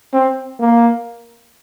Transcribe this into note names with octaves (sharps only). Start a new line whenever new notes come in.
C4
A#3